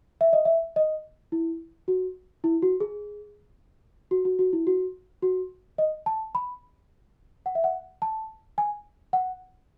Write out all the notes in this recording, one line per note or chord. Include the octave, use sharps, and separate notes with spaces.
E5
D#5
E5
D#5
E4
F#4
E4
F#4
G#4
F#4
F#4
F#4
E4
F#4
F#4
D#5
A5
B5
F#5
E5
F#5
A5
G#5
F#5